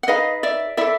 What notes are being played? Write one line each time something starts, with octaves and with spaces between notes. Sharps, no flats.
F#5
D#4 G#4 B4 D#5 F5
D5 E5
E4 A4 D5 E5